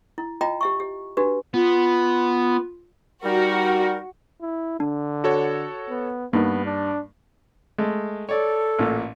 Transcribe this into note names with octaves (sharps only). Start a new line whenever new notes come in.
E4
F4 D#5 G5 A#5
G4 E5 C#6
G4
D4 F#4 G4 B4
B3 F4
G3 D#4 F#4 A#4
E4
D3 D4
F#4 A4 C#5
B3
G2 A#3 B3 D#4 A#4
D4
G#3 A3
A4 C#5 D5
A1 A#2